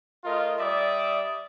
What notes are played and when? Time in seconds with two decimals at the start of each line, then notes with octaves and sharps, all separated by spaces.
0.24 A3 F4 A#4 D#5
0.59 G3 D5 E5 D#6